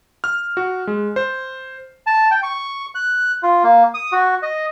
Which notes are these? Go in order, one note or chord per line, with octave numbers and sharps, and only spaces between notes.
F6
F#4
G#3
C5
A5
G5
C#6
F#6
F4
A#3
D#6
F#4
D#5